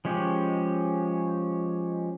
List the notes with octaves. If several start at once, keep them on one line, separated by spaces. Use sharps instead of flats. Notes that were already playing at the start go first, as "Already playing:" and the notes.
F3 G#3 C#4 G4